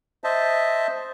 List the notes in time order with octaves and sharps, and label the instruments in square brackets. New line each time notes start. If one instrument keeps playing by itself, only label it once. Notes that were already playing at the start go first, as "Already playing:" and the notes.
[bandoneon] C5 D#5 E5 A5